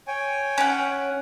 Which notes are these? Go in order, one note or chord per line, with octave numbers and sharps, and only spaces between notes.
C#5 G5 G#5
C#4 F#5